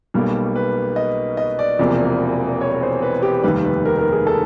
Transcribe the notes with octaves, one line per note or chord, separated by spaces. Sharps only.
B1 B2 G3 A#3
B4
D#5
D#5
D5
E1 E2 C3 F3 A#3
C#5
C5
B4
G4
F1 D#2 D#3 G3 B4
B4
A#4
A#4
G#4
A4